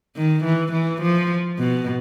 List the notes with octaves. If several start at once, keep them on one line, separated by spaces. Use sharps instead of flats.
D#3
E3
E3
F3
B2